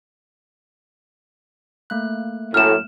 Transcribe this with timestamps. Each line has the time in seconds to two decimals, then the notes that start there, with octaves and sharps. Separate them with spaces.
1.90 A3 A#3 F#6
2.54 F#2 A2 F6 E7